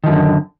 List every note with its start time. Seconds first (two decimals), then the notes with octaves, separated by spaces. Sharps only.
0.04 D#3
0.06 F3
0.09 F#2
0.11 D3